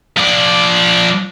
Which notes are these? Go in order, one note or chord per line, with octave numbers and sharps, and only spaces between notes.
F3 D5